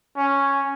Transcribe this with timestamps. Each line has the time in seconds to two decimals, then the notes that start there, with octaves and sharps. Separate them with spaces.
0.17 C#4